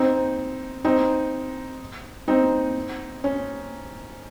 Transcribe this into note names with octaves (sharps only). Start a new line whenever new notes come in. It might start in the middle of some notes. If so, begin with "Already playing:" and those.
Already playing: C4 D#4
C4 D#4
C4 D#4
C#4